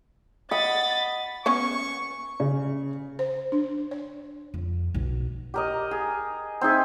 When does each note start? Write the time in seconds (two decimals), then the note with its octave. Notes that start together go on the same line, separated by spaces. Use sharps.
0.51 D#5 F#5 B5 A6
1.46 B3 C#4 C#5 C#6
2.40 C#3
3.19 C5
3.52 D4
3.91 C#5
4.54 F2
4.94 B1
5.54 G4 A#4 D#5
5.91 G#4
6.61 C4 D#4 G#4 E5